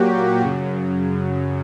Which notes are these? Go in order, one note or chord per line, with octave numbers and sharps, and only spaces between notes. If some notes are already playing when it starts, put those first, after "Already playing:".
Already playing: A#2 F#3 A#3 F#4 G4
F#2 C#3 F#3